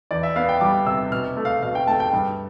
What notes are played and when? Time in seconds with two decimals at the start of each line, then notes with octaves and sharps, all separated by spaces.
0.11 E2 D5
0.23 E5
0.36 B3 F5
0.49 G5
0.61 G3 D6
0.86 C3 E6
1.12 B2 F6
1.37 A3
1.45 F5
1.62 B2 F5
1.75 G5
1.88 A3 A5
2.00 G5
2.13 G2